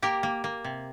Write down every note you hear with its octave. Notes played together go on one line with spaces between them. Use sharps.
A#3 G4 A#4
A#3
A#3
C3